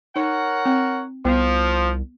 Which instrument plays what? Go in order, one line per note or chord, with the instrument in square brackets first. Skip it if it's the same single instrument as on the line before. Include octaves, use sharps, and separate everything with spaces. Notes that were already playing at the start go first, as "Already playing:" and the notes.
[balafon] D#4 [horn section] A#4 C#5 F#5
[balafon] C4
[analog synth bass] C2 [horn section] F3 [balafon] B3